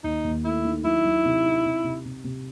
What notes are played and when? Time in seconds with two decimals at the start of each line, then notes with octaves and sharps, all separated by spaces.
0.04 D#2 D#4
0.24 D#2
0.44 A3 E4
0.65 D#3
0.84 F#3 E4
1.05 F#3
1.25 C3
1.45 D#4
1.65 C3
1.84 C3
2.05 C3
2.24 C3